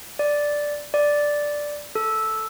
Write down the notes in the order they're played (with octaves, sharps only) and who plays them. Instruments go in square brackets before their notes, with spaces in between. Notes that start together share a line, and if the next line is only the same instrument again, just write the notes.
[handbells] D5
D5
A4